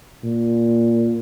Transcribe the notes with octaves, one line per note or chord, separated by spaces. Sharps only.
A#2